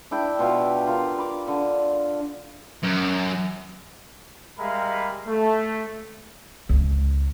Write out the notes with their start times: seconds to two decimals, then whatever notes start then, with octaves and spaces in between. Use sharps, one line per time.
0.11 D4 E4 G5
0.39 B2 F4 G4 E5
0.87 F4 A#4
1.18 B5 D6
1.48 D3
2.83 F#2
4.58 G3 G#3 A#4 E5 F5 B5
5.28 A3
6.69 C#2